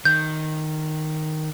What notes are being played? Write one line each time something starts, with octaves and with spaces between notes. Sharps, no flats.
D#3 G6